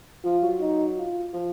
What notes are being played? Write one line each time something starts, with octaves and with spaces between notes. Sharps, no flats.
F3 F4
F#3
D#4
F4
F3